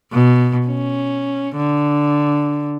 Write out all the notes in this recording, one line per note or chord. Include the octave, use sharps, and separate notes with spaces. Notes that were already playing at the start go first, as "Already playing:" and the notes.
B2
C#4
D3